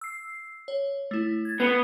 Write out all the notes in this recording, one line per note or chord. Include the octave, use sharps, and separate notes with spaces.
E6 C7
C#5
A3 E4
G#6 A6
B3 C7 F7 G7